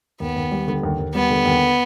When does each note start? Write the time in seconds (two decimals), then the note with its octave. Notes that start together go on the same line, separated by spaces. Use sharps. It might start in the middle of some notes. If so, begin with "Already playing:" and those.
0.20 D#2 B3
0.36 D#2
0.51 G3
0.68 D3
0.83 D#2
0.99 D#2
1.14 G3 B3
1.30 D3
1.46 D#2